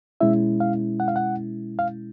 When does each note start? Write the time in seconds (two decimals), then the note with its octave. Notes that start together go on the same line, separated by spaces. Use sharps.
0.21 B2 G#3 C#4 E4 E5
0.60 F5
1.00 F#5
1.08 F5
1.16 F#5
1.79 F5